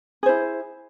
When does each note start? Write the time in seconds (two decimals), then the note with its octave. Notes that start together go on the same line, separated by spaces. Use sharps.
0.23 G#4
0.26 C5
0.29 E4